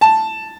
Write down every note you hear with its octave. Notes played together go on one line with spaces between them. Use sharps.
A5